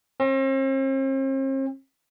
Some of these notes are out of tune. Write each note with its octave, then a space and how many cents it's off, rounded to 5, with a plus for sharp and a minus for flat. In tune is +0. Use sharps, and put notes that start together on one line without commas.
C4 +45